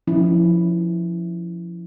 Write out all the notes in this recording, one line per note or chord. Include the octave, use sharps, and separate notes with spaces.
F3 C#4 E4